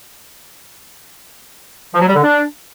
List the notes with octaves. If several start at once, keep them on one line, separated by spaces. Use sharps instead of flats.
F3
F#3
G3
D3
D4